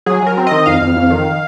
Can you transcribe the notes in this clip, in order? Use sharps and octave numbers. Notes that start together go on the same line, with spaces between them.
F#3 G#4
F#3 A#4
C4
D#3 D#5
F2 F5
F2
F2
D#3